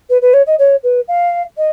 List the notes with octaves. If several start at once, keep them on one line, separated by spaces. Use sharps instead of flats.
B4
B4
C#5
D#5
C#5
B4
F5
D#5